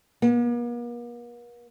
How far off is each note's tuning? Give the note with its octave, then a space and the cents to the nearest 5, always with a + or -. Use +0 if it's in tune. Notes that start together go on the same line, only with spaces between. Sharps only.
A#3 +45